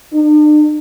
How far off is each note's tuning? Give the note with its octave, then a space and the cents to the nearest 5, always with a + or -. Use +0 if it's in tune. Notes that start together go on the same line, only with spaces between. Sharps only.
D4 +45